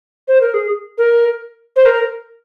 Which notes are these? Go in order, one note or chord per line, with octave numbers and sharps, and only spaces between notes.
C5
A#4
G#4
A#4
C5
A#4